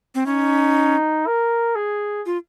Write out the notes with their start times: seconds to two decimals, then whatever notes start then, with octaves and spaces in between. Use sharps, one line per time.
0.15 C4
0.26 C#4 D#4
1.27 A#4
1.75 G#4
2.26 F4